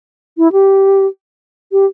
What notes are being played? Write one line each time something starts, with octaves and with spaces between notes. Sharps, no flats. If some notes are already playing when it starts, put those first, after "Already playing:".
E4
G4
G4